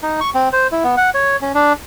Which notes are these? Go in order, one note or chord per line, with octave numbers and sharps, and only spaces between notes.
D#4
C#6
C4
C5
E4
B3
F#5
C#5
C#4
D4